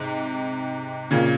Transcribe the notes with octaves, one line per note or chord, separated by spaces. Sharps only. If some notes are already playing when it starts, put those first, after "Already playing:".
Already playing: G#2 C3
A#2 C#3